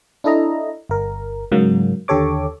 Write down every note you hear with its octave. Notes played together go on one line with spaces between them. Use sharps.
D4 E4 A4 D#5 A#5
G1 A#4
G#2 C#3 F#3 A#3
D#2 D3 G4 A4 C#5 D6